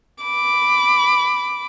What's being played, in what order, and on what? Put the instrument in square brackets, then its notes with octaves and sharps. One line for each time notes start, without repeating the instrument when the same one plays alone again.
[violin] B5 D6